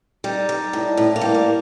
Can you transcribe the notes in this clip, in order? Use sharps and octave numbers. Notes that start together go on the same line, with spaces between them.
G3 D#4
G3
A2
A2
A#3
G3
A#3